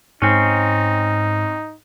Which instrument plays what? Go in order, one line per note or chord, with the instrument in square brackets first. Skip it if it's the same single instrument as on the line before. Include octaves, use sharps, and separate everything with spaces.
[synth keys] G#2 [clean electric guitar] C4 C#4 [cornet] D#4